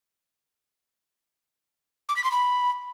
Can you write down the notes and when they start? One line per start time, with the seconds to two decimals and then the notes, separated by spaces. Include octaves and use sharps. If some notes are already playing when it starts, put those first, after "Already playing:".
2.09 D6
2.16 B6
2.24 C6
2.32 B5